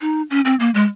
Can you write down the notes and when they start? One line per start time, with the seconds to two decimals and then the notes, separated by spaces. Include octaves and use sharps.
0.01 D#4
0.30 C#4
0.45 C4
0.60 A#3
0.74 G#3